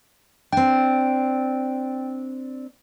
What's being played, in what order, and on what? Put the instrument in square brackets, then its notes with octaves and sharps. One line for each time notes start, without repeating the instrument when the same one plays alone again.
[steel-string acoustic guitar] C4 D4 [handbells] G5